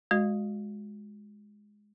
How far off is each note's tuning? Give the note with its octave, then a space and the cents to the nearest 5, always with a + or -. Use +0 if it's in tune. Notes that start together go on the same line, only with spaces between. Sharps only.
G#3 +0 F#4 -20 D#5 -30